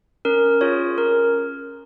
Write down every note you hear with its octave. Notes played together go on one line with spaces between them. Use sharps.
C#4 A#4
F4 G#4 C#5
C#4 A#4